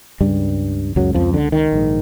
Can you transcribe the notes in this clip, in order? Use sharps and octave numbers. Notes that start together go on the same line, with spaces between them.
C#2 G2 C#3 G3
C#2 F#2 C#3 F#3
F2 F3
D3
D#3
A#1 G#2